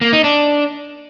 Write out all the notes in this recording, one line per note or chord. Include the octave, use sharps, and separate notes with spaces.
A#3
D#4
D4